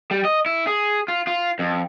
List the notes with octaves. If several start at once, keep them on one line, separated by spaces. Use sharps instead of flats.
G3
D#5
E4
G#4
F4
F4
F2